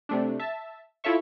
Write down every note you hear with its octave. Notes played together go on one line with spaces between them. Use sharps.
C3 A3 D4
E5 A5
E4 F4 A4 C#5 E5 C#6